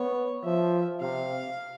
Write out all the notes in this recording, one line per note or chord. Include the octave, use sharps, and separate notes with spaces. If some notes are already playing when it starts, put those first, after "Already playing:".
Already playing: B3 C#5
F3 E5
C3 F5